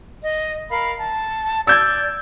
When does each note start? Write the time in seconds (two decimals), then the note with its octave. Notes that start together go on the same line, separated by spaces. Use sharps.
0.21 D#5
0.70 A#4 F5 B5
0.99 A5
1.67 D5 E6 G6 G#6